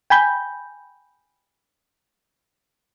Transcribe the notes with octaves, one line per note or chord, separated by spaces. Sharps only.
G5 G#5 B5 G6